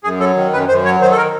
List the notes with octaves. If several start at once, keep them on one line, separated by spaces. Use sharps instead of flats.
F#2 G#4
F#3 A4
D#3
F#2 B4
F#2 C5
F#3 C#5
D#3 C5
A4
A#4